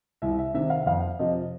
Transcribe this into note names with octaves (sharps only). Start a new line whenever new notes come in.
C2 E5
E5
C3 D#3 E5
F5
F2 F5
C3 F3 D#5